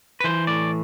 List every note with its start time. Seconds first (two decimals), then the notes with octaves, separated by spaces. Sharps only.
0.20 B4
0.24 E3 C5
0.47 A2 D5